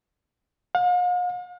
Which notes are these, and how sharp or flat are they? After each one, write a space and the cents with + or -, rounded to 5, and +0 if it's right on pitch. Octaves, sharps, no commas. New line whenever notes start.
F5 +45